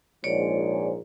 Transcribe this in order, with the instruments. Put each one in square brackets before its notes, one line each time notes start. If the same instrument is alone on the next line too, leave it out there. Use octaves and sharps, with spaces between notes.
[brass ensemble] A#1 G#2 [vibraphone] C#5 D5